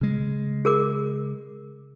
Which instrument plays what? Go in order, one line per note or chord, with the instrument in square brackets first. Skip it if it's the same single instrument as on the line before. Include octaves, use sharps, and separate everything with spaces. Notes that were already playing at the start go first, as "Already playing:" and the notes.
[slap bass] C#3 G#3
[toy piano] G#4 A#4 D6